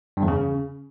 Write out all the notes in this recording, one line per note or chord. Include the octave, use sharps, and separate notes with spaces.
G2
E2
C#3